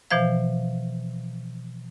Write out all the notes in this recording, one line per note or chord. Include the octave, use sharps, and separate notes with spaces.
B2 E3 F3 C5 F5